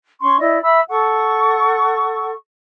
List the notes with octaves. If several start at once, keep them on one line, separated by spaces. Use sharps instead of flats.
C#4 C6 C#6
E4 D5 D#5
E5 B5 E6
A4 F#5 C#6